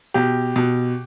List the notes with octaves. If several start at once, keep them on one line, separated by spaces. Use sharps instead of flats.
B2 G4
B2